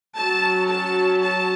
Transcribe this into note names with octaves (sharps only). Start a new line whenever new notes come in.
F#3 C#4 A5
A5
A5